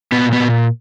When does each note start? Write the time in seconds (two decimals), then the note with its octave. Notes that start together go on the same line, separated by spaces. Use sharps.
0.12 A#2 B3
0.33 B3
0.40 A#2